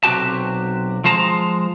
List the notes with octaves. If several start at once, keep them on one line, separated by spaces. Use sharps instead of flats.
B1 C3 C#4 F#4 G4 A5
F3 G#3 C5 A5 A#5